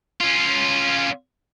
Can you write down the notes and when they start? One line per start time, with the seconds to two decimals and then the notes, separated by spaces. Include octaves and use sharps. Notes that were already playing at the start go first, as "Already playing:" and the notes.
0.21 C#4 F4